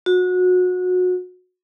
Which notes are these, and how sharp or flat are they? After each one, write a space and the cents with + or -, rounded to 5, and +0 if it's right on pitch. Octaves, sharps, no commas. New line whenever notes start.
F#4 -25